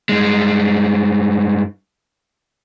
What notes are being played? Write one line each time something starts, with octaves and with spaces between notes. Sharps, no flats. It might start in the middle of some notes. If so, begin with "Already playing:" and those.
G2 G#3